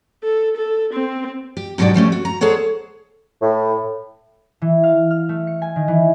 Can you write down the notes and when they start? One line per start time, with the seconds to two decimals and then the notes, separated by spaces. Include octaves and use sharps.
0.23 A4
0.56 A4
0.94 C4
1.57 G4
1.78 G#2 B2 F#3 D4 G4 D5
1.94 F3 G3 A3 C#4
2.12 F#4
2.25 A#5
2.41 G#4 A4 C5 C#5 F#5
3.42 A2
4.62 E3
4.84 F5
5.11 F6
5.29 A3
5.47 C#7
5.62 G#5
5.76 D#3
5.88 E3